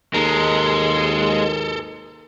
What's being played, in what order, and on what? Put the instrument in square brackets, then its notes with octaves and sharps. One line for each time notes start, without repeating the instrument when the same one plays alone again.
[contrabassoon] D#2 [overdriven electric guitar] G#3 [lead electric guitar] A4 A#4